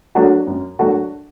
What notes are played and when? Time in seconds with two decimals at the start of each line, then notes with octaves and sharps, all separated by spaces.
0.15 F#3 A3 D4 F#4
0.47 F#2
0.79 F#3 A3 D4 F#4